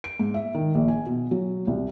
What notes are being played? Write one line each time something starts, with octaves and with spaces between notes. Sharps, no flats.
D7
G#2
E5
D#3
A#1
G#5
B2
F#3
C2